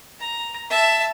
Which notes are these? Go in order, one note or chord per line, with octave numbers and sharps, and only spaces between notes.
A#5
E5 A5